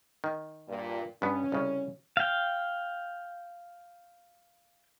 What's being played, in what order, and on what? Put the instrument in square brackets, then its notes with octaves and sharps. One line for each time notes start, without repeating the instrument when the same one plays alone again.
[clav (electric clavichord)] D#3
[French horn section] G2 A#2
[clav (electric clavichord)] G2 B3 [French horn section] C#4
[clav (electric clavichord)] C2 C#3
[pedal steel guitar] F5 G5